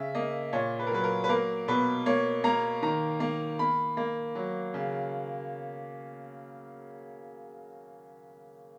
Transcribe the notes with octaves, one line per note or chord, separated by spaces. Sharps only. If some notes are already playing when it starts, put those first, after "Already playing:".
Already playing: C#3 E5
A#3 D#5
A#2 C#5
B4
A#4
F#3 B4
A#4
B4
A#3 A#4
B2 B4
A#3 C#5
A#3 A#5
D#3 A#5
A#3
A#3 B5
A#3
F#3
C#3